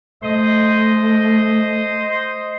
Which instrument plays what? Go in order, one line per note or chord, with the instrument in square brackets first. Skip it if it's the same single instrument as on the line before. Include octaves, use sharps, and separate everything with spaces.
[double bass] A3 [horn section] C5 D#5